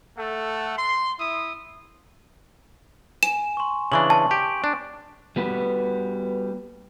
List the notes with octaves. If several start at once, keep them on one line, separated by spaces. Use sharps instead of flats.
A3 A4 F#5
C6
E4 E5 D#6
G#5 E7
C6 C#6
C#3 E3 D4 C#6 F#7
A5
G4 D7
D4
G3 B3 F#4 B4